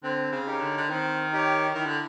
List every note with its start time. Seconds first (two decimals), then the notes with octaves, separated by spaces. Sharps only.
0.03 D3 C4
0.32 C#3
0.46 D#4 G4 A#4 C#5
0.60 D3
0.77 D3
0.89 D#3 C4
1.32 D#4 G4 A#4 C#5
1.75 D#3 E4
1.86 D3